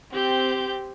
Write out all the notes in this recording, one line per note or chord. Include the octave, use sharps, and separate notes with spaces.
C4 G4 G6